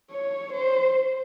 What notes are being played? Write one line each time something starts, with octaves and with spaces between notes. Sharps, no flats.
C#5
C5